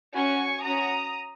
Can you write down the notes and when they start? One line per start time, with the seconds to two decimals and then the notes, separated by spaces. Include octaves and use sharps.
0.14 C#4 F#4 G#5 C#6
0.63 C#4 F#4 A#5 D#6